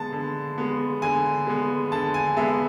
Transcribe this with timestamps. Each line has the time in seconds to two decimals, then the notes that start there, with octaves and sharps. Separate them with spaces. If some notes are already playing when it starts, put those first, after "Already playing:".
Already playing: D3 G#3 B3 A5
0.12 D3
0.58 G#3 B3
1.02 D3 G#5
1.47 G#3 B3
1.92 D3 A5
2.14 G#5
2.36 G#3 B3 E5